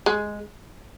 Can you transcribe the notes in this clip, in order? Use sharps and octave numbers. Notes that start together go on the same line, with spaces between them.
G#3